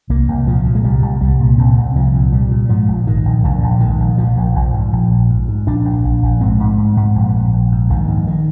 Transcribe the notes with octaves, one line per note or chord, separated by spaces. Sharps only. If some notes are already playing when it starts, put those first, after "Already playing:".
C2 A#3
C2
A#2 F3
A#2
G#3
C2 G3
C2
C2 G3
A#2
C2 C4
C2
C2 F3
A#2
A#2 G3
A#2
G#2 F3
A#1
G#2 D#3
A#1
A#1 D3
A#1
G#2 D#3
A#1
A#1 F3
A#1
A#1
G#2
A#1
A#1
G#2
G#2
A#1 D4
A#1
A#1
A#1
G#2 C4
G#2
G#2
G#2
A#1
A#1
A#1
G#2
A#1 D#3
G#2
D#3